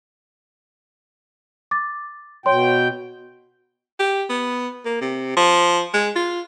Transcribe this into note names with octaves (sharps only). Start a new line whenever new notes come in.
D6 A6
B2 C#5 G5 C6
G4
B3
A#3
C3
F3
G#3
F4